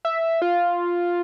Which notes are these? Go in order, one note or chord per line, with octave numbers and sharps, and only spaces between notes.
E5
F4